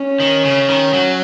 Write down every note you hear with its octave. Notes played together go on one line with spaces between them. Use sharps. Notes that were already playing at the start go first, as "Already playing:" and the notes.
Already playing: C#4
D#3
C#3
D#3
F#3